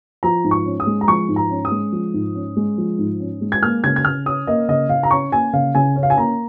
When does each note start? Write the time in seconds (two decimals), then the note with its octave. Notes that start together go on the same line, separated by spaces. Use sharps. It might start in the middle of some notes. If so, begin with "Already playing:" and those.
0.23 F3 A#5
0.44 G#2
0.51 C#6
0.66 C#4
0.80 D#6
0.87 G#3
1.01 A#5
1.08 F3 C#6
1.29 G#2
1.36 A#5
1.51 C#4
1.65 D#6
1.71 G#3
1.92 F3
2.14 G#2
2.35 C#4
2.57 G#3
2.78 F3
2.99 G#2
3.20 C#4
3.41 G#3
3.52 G#6
3.63 A#3 F6
3.84 C#3 G#6
3.96 G#6
4.05 C#3 F6
4.26 C#4 D#6
4.47 A#3 D#5
4.69 C#3 D#5
4.89 C#3 F5
5.03 A#5
5.11 C#4 C#6
5.32 A#3 G#5
5.53 C#3 F5
5.75 C#3 G#5
5.96 C#4
6.03 F5
6.10 G#5
6.17 A#3 A#5